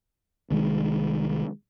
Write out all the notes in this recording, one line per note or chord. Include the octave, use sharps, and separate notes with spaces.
C2 D#3 G#3